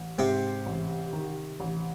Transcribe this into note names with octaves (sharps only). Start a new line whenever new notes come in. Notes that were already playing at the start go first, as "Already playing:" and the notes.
Already playing: A1
G#2 C3 C4
A1
D#3
A1